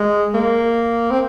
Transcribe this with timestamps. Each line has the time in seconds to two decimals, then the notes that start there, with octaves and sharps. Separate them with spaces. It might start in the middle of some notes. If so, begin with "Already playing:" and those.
Already playing: G#3
0.34 A#3
1.11 C4